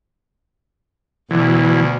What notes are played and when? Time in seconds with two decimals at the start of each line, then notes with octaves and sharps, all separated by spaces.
1.31 D2 B2 E3